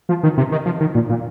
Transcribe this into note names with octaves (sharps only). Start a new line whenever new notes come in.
F3
D#3
C3
D#3
F3
D#3
A#2
A#2